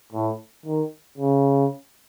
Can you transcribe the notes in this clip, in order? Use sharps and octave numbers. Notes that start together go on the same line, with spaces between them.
A2
D#3
C#3